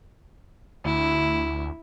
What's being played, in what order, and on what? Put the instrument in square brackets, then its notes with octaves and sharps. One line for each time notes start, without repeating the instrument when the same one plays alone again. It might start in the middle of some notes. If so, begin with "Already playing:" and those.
[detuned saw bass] D2 [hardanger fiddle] E4